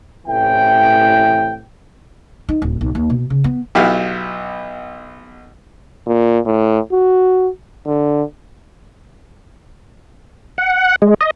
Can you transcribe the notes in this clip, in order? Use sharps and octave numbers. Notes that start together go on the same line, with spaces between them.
A1 A2 C3 E3 G5
D#4
D1
B1
D#2
B2
C#3
B3
B1 B3 E4 F#4 G4 F5
A#2
A2
F#4
D3
F#5
G#3
D#5